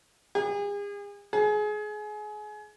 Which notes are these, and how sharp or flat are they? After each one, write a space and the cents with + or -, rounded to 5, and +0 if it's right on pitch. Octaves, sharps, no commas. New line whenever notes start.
G#4 -40
G#4 +25